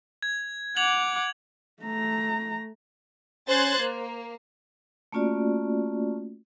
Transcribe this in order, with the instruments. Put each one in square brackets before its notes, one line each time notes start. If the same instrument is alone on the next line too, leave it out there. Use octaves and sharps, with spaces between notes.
[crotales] G#6
[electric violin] F#5 D6 [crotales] G#6 F7 F#7
[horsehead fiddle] A3 A#5
[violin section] C#4 C5 F#6 G#6 A6
A#3
[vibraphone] A3 A#3 C#4 F4 F#4 D5